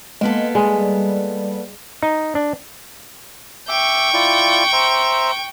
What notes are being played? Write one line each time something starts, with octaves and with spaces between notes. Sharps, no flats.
G#3 A#3 B3 A4
G3 G#3
D#4
D4
E5 G5 C#6 D6
E4 F4 D5
C5 E5 A#5